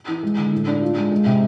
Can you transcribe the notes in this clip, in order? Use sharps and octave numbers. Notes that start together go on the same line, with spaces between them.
E3
G#3
D3
A2
D4
F4
G#3
G#3
C3